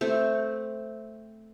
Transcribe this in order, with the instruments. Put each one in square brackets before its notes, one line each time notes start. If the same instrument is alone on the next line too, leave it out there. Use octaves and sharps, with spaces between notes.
[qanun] A3 C4